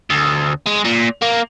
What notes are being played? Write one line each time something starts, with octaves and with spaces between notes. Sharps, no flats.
D2
G#3
A#2
A#3